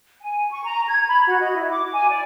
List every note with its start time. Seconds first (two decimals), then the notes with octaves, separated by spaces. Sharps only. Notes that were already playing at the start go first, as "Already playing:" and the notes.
0.21 G#5
0.50 C#6
0.64 A#5
0.88 G#6
1.07 B5
1.27 F#4
1.40 D#5
1.55 E4
1.71 D6
1.92 G#5
2.10 D5